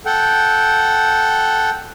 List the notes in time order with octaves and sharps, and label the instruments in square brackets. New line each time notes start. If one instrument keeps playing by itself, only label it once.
[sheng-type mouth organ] A4 F#5 G5